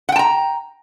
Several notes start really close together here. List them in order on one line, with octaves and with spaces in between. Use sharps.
F#5 G5 A5 A#5